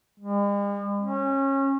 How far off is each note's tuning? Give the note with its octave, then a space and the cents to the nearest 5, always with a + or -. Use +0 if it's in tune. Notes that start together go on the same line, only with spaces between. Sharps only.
G#3 -45
C#4 -25